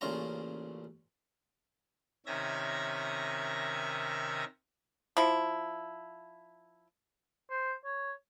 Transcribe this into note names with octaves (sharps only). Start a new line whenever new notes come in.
A1 A#2 C#3 F4 A#5
C3 D#3 C#4 E5 G#6 A#6
F3 E4
C5
C#5